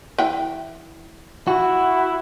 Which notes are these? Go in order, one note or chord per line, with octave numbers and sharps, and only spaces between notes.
E3 G5
E4 F#4